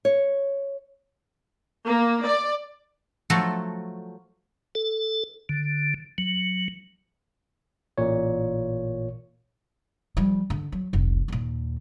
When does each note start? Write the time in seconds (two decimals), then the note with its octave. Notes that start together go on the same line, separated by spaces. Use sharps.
0.05 C#5
1.85 A#3
2.25 D5
3.30 F3 F#3 A3 F#4 A4
4.75 A4
5.49 D3
6.18 F#3
7.98 A1 A#2 C#5
10.17 F3 G3
10.50 D3
10.72 F#3
10.93 F1 C2
11.28 D#2 A#2